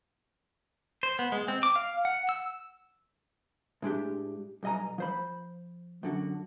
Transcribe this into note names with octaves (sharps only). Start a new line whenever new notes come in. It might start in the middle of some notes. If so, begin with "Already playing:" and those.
C5
B3
G#3
C4
D6
F5
F#5
E6
A2 G#3 D4 G4
B1 G2 D#5 G#5 A#5
F3 C5 B5
F#2 D3 F#4